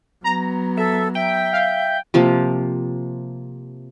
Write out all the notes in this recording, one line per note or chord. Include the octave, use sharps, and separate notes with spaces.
F#3 B3 A#5
A4 E5
E5 G5
F5
C3 F3 A#3